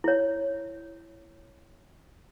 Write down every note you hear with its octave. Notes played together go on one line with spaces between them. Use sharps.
E4 C#5